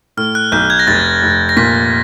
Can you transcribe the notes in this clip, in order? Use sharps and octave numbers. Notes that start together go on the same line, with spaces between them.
A2 F6
F#6
B1 G6
G#6
A#6
F1 A6
F1
A#6
A#2 B6